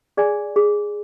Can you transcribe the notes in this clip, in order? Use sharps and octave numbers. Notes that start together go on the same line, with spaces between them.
G#4 D5 G#5
G#4